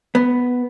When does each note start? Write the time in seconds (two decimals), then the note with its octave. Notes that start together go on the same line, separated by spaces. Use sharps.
0.15 B3